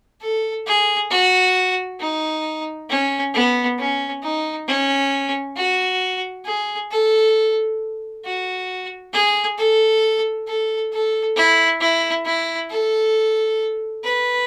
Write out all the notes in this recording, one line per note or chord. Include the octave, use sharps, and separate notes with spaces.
A4
G#4
F#4
D#4
C#4
B3
C#4
D#4
C#4
F#4
G#4
A4
F#4
G#4
A4
A4
A4
E4
E4
E4
A4
B4